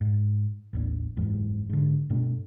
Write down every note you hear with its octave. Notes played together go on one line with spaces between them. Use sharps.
G#2
A1 D#2 D4
F#1 E2 G#2
G#2 D3
G2 B2 A3 D4